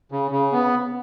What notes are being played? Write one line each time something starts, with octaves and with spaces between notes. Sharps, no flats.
C#3
C#3
B3